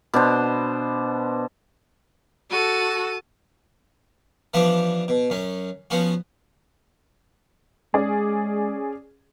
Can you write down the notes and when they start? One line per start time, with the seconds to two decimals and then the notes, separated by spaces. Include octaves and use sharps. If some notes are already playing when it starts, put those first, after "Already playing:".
0.14 B2 D4 C5
2.50 F#4 A4 A5 D#7
4.54 E3 F3 G3 B3 D4
5.08 B2
5.30 F#2 C#4
5.90 F3 B3 C#4 F#4
7.94 G#3 C#4 G#4 D5